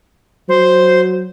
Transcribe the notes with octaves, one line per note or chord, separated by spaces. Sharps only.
F#3 C5